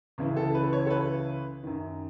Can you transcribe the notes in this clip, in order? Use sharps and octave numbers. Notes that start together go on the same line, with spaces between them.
C#2 C#3 E3
A4
B4
C#5
A4
B4
F#2 D#3